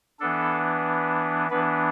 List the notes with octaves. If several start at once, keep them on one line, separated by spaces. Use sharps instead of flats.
E3 B3 D4 A4
E3 B3 D4 B4